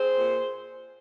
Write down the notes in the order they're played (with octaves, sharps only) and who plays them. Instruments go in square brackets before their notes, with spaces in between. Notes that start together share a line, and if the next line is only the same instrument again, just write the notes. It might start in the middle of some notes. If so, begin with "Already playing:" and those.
Already playing: [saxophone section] C4 G#4 C5
A#2